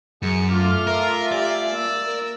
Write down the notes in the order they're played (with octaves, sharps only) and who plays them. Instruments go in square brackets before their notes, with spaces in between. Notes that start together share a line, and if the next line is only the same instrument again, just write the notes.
[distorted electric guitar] F#2 [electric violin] G#4 C#7
[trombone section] A3 F4 [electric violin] D6 F6
[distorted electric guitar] A#4 [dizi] E5
[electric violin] G4 G#5 [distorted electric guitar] D5
[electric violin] A#3 E6
[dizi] A#4